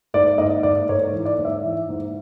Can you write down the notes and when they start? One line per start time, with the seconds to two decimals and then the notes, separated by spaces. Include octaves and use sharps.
0.14 G#2 D5
0.38 G#2 D#5
0.63 G#2 D5
0.88 G#2 C#5
1.08 C#5
1.13 E3
1.26 D5
1.39 G#2
1.45 E5
1.63 E3
1.89 G#2